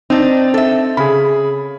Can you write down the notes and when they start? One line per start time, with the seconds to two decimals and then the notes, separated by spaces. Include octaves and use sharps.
0.10 C4 D4 D#4
0.54 A4 E5
0.97 C#3 G#4 B5